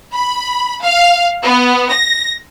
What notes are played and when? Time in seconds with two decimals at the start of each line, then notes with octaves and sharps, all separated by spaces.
0.13 B5
0.82 F5
1.43 B3
1.91 A#6